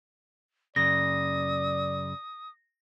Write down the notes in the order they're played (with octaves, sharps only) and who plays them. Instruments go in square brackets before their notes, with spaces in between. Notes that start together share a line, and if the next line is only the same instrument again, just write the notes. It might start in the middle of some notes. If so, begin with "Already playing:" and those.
[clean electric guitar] F#2 C#3 [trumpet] D5 [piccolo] D#6 [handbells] A#6